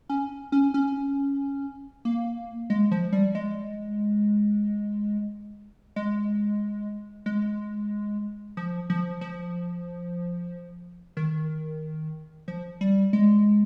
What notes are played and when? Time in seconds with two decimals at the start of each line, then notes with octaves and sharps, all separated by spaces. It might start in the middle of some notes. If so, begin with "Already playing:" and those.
0.09 C#4
0.52 C#4
0.74 C#4
2.05 A#3
2.70 G#3
2.91 F3
3.13 G3
3.35 G#3
5.96 G#3
7.26 G#3
8.57 F3
8.90 F3
9.21 F3
11.17 D#3
12.48 F3
12.81 G3
13.13 G#3